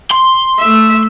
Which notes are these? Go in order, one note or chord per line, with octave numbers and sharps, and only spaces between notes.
C6
A3 E5